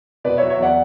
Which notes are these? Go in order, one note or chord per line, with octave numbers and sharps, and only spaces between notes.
B2 B4 D5
C#5 E5
F#3
C#5 E5
E2 D5 F#5